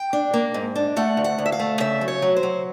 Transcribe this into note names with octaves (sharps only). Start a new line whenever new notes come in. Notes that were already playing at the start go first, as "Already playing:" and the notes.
Already playing: G5
D4
A#3
G#2
D4
A3 F#5
D2
F#5
D2
E5
F5
A3
C#3 E5
F#3
C#5
F#3
C5
F#3